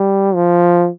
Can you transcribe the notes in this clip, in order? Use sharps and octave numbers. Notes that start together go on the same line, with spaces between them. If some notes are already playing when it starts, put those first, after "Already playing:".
Already playing: G3
F3